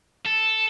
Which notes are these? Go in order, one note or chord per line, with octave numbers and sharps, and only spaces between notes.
A4